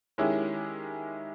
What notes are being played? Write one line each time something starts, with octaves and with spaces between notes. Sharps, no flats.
D#3 G#3 C#4 E4 G4